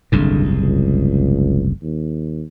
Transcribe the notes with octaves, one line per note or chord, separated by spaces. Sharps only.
F#1 C2 G#2 D3
C#2
D#2